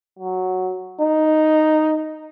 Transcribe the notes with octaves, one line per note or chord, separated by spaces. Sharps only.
F#3
D#4